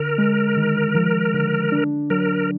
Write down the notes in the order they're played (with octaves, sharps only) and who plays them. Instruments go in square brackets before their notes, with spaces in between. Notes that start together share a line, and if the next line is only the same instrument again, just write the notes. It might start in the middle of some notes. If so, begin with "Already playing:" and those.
Already playing: [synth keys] D3 [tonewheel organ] A#4
[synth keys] G#3
D#3
F3
D3
D4
[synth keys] F#3 [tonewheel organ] A#4